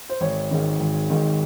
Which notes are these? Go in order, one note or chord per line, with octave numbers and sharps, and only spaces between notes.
C5
G#1 C#5
G#2 D#3
G#1
G#2 D#3